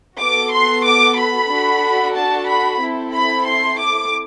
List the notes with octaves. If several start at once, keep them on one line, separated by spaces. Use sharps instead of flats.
B3 F#4 A4 D6
C6
D6
B5
D4 F#4 A4
A5
B5
C4 E4 A4
B5
C6
D6